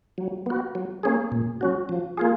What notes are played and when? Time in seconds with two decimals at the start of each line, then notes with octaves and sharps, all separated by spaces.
0.18 F#3
0.46 B3 F#4
0.75 F#3
1.03 A#3 C#4 G#4
1.32 A#2
1.61 F#3 C#4 F#4
1.89 F3
2.17 A#3 F4 G#4